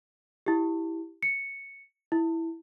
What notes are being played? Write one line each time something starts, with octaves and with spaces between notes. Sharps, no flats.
E4 G4
C#7
E4